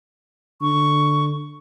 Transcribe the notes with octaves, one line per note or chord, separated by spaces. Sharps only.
D3 C#6